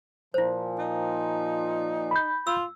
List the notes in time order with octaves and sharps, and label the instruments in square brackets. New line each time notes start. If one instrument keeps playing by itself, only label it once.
[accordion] A#2 F3 [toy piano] E4 C5
[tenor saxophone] D#4
[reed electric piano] B5 G6
[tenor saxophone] F4 [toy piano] E6